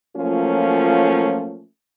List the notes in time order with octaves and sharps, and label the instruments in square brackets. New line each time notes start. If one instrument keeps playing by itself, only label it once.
[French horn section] F3 F#3 A3 A#3 C#4 F4